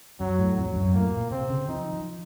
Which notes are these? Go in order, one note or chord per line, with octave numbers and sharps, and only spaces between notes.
F#2 F#3
A2
F2 F#3
F#2
A2 A#3
A#2
C3 C4
C#3
F3 D#4
F3